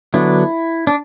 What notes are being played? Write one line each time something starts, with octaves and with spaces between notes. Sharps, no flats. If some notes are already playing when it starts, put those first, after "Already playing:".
D3 F#3 B3 D4 E4
D4